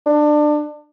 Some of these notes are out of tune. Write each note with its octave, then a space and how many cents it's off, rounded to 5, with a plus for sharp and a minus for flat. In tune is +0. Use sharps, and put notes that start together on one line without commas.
D4 +25